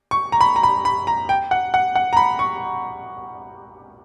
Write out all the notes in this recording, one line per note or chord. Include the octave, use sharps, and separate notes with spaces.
C#6
A#5
B5
A#5
B5
B5
A#5
G5
F#5
F#5
F#5
A#5
B5
C#6